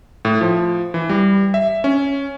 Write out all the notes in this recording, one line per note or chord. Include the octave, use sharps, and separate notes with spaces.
A2
F3
E3
G3
E5
C#4